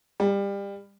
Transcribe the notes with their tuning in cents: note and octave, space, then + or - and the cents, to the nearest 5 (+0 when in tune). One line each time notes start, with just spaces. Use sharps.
G3 +25